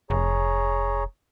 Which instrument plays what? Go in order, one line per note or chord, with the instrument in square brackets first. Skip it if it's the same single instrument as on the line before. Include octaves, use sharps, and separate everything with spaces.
[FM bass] F1 [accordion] G#4 C#5 A#5